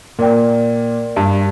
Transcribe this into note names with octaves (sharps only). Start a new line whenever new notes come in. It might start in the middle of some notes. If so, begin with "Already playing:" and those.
A#2 A#4 D5 G5
G2